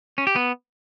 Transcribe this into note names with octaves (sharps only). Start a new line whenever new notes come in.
C#4
G4
B3